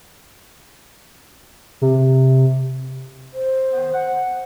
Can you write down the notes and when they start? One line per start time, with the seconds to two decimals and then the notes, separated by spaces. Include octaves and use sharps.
1.82 C3
3.34 C5
3.73 D#3 B3
3.94 F#5